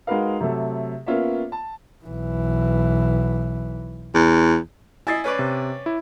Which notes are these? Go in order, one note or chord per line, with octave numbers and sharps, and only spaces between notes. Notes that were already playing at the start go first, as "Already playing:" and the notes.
G#3 D#4 F#4 A#4 B4 F5
C3 F#3 A3 A4
A#3 B3 C#4 F4 C#5 E5
A5
B1 E3
E2
E4 D#5 G#5 A6 C7
C#4 B4 D5
C3
E4